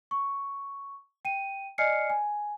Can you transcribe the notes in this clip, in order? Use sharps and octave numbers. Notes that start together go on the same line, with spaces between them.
C#6
G5 D#7
D5 D#5 G#5 F6 C7 C#7
G#5